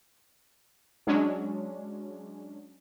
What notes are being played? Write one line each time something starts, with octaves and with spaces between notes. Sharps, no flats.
F#3 G#3 C#4 D4